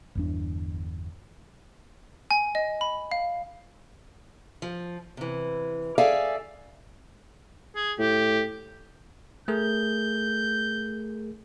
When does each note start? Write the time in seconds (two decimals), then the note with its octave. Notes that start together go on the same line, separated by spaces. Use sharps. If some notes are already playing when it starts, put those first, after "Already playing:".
0.15 G1 E2 D4
2.31 G#5
2.55 D#5
2.81 B5
3.11 F5
4.62 F3
5.17 C3 E3
5.98 G#4 A4 D5 E5 F5 G#5
7.76 G#4
7.99 A2 G4
9.48 A3 G#4 A#4 G6